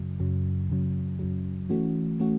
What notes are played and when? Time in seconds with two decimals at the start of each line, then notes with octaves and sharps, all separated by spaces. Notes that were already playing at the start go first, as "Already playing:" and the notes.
Already playing: F#2 C#3 F#3
0.20 F#2 C#3 F#3
0.69 F#2 C#3 F#3
1.19 F#2 C#3 F#3
1.69 E3 A3 C#4 F#4
2.20 E3 A3 C#4 F#4